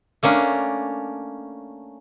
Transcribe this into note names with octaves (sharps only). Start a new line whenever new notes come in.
A3 A#3 C#4 D4